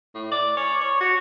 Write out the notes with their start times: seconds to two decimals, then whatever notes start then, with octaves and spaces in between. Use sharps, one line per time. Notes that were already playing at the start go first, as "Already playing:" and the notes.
0.15 A2
0.32 D5
0.57 C#5
0.81 C#5
1.01 F#4